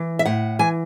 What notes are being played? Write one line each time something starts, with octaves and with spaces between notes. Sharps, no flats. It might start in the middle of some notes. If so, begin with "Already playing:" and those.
Already playing: E3
E5
A2 F#5
E3 G#5